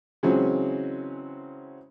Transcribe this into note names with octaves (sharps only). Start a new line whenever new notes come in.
C#3 E3 F#3 G#3 C4 C#4